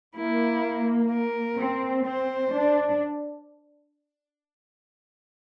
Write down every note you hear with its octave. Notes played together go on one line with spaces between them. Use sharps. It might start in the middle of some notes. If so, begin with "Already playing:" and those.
A#3 E4
A#4
C4
C4 C5
D4